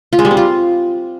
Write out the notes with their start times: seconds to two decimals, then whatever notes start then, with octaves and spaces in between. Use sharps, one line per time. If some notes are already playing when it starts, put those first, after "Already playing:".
0.13 F4
0.19 G#3
0.25 G3
0.31 C4
0.37 F4